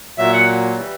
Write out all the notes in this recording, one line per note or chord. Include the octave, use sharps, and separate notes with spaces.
A#2 F#3 E5
F#5
E3 G3